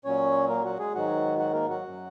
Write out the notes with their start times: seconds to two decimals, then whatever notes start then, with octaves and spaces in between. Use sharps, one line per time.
0.05 A#2 F#3 C#4 C#5
0.49 A#3 A#4
0.64 F#3 F#4
0.79 G#3 G#4
0.94 G#2 D#3 F#3 F#4
1.39 F#3 F#4
1.53 A#3 A#4
1.68 F#3 F#4
1.84 F#2 F#3